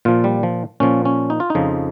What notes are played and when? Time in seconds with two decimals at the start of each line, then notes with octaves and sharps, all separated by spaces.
0.05 A#2 F3 F4
0.24 G3
0.43 F3
0.80 A#2 F3 C#4
1.05 C#4
1.30 D#4
1.40 F4
1.50 D#4
1.55 F2 C#3 F3